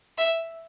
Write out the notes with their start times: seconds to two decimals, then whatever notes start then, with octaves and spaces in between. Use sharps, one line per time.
0.18 E5